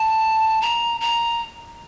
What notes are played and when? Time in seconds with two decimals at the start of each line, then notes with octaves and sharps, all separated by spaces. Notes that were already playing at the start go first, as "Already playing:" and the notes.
Already playing: A5
0.62 A#5
1.01 A#5